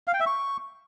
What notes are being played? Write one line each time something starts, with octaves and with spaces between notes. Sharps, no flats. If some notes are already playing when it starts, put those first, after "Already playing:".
F5
G5
E5
C#6